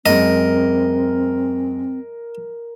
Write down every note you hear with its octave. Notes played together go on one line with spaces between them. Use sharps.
F#2 G#3 C4 A#4 D#5